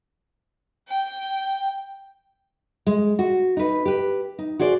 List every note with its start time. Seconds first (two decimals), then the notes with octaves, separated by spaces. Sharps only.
0.88 G5
2.87 G#3
3.19 F#4
3.57 D#4 B4
3.85 G4 B4
4.39 D#4
4.59 F#4 G#4 C5 D5